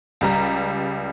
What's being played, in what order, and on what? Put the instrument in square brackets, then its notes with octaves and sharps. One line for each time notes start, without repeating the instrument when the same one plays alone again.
[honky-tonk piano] C#2 G3 A#5